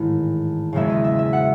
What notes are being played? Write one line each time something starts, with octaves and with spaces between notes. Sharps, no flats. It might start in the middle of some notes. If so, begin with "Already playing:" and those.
Already playing: A1 G#2 D#3 G#3
F#1 E2 C#3 G#3 C#4 E5
D#5
E5
E5
F#5